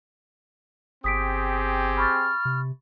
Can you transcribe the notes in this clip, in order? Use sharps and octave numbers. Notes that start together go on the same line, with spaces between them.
G1 C4 G4 G#4 D#6 B6 D7
B5 C#6 F6 A6
C3